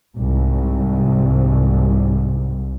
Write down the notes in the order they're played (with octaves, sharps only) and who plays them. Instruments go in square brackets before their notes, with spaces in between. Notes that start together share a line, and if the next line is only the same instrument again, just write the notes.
[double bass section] C2 G#2